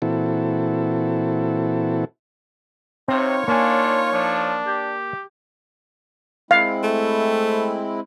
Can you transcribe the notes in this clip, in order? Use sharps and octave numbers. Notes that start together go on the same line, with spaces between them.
A#2 E3 C4 E4 F#4 A4
C3 C4 D#4 F4 C#5
A#3 D4 F4 G#5
F3 D4
G4
G#3 C4 E4 F5
A3